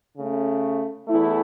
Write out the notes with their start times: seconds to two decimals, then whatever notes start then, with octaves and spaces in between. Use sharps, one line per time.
0.16 C#3 A3 C#4
1.08 E2 E3 A3 E4